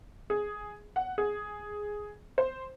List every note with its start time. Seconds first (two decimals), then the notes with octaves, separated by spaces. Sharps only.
0.30 G#4
0.96 F#5
1.18 G#4
2.38 C5